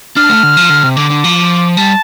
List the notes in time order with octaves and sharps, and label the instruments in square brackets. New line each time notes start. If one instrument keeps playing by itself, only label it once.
[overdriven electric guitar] D4 [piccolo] F6
[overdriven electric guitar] A3
D3
F3
D3
C3
[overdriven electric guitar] D3 [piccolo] D6
[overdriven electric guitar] D3
F3
[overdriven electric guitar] G3 [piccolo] A5